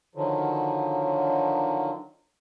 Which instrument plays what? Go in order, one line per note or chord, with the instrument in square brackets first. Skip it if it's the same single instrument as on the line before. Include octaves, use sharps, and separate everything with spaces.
[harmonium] D3 D#3 F3 F#3